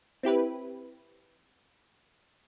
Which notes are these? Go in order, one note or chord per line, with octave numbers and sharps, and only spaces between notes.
C4 E4 G4 B4